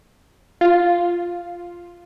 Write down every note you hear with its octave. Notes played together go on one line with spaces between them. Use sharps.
F4